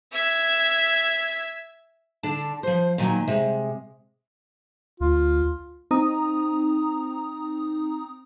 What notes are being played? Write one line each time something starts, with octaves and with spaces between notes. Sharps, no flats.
E5 G#6
D3 D4 A5
F3 C5
A#2 D#3 F#3 G#5
C3 G#3
D2 F4
C4 D#4 A#5 D#6